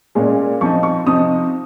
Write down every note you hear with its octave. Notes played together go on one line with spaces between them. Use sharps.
A#2 G#3 C#4
F3 C4 D#4 C#6
C#6
C3 F3 C4 D#4 D#6